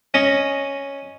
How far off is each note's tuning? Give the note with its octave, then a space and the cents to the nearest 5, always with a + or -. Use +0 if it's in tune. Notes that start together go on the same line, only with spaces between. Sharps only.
C#4 +0 D#5 +0